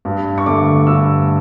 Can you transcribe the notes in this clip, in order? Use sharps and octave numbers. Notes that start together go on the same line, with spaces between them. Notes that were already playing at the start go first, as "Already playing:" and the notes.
G2
C#6
D3 A3 D6
G2 E6